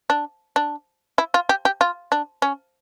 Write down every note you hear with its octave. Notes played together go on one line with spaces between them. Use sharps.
D4
D4
E4
F4
G4
G4
F4
D4
C#4